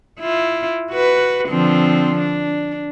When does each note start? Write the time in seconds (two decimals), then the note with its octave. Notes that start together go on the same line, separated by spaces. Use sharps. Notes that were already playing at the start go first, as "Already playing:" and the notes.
0.20 E4 F4
0.91 F#4 B4
1.49 D3 F3 C4
2.18 D4